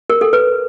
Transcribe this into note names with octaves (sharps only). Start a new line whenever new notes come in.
A#4
A4
B4